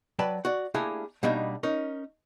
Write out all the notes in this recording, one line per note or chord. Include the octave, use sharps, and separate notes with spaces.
F#3 B4 D5 G5 A5 B5
F#4 D5
A3 A#3 D4 E4 G4 G#4
B2 G3 A#3 D4 D#4
C#4 D#4 A#4